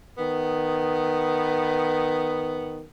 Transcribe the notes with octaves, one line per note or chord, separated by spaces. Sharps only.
D#3 B3